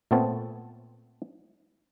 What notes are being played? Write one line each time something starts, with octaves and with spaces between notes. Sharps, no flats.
A#2 A3 B3 C4 C#5 A5